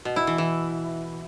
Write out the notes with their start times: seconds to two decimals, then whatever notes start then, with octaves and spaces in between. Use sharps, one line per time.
0.05 B2
0.16 E4
0.27 E3
0.38 E3